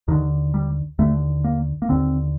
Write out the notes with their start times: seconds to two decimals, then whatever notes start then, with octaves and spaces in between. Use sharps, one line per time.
0.08 D#2 D3 D#3
0.54 G3
0.99 D#2 D3 A3
1.44 A#3
1.82 A#3
1.89 D#2 D3 C4